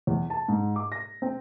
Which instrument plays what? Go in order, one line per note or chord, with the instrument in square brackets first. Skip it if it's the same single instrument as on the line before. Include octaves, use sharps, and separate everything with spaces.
[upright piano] E2
A5
G#2
D6
A#6
C4